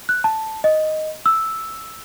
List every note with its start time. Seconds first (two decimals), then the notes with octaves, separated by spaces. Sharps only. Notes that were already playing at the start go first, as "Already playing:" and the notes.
0.09 F#6
0.24 A5
0.64 D#5
1.26 E6